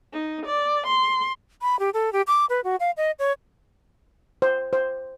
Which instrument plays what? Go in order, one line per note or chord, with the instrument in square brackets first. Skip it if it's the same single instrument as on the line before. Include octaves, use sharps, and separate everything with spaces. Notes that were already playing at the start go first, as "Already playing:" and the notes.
[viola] D#4
D5
C6
[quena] B5
G4
A4
G4
D6
B4
F#4
F5
D#5
C#5
[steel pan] C5
C5